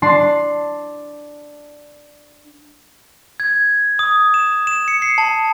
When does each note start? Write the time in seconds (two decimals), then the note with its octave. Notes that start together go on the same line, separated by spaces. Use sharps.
0.02 D4 A5 C6
3.40 G#6
3.99 D#6
4.34 E7
4.67 E7
4.88 C#7
5.02 C7
5.18 A5